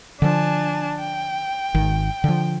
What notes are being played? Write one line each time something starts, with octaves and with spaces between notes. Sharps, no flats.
D3 F3 D4 G#5 A5
G5
G#1 D#3
D3 F3